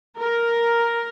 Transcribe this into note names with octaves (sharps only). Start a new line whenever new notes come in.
A#4